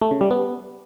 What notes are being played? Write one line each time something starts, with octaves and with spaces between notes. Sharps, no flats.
A3
C#3
G3
B3